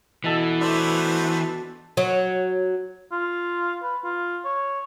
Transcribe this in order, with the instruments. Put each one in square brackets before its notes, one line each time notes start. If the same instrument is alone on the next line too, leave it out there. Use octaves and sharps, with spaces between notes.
[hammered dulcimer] B2 A4 [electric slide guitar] E3
[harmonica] A3 B3 C5 [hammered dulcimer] D4 D5 E5
[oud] F#3
[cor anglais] F4
B4
F4
C#5